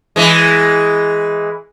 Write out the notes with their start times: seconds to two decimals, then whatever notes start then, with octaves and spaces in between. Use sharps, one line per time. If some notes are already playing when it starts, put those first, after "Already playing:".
0.16 E3 G#3